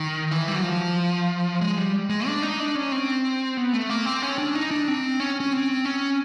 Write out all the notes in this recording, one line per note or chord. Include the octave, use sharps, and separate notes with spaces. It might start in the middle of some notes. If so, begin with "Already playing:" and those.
Already playing: D#3
E3
G3
F#3
F3
G#3
G3
G#3
D4
D#4
D4
C#4
C4
B3
A3
A#3
C4
C#4
D4
D#4
D4
C4
C#4
C#4
C4
C#4